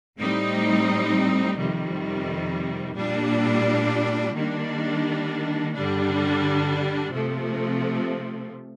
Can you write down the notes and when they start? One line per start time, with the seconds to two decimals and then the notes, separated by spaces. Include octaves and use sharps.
0.17 A2 G3 C4 D#4
1.56 F2 C3 D#3 G3
2.95 A#2 G3 D4
4.34 D#3 G3 A#3 D4
5.73 G2 D3 G3 D4
7.12 C3 F3 A3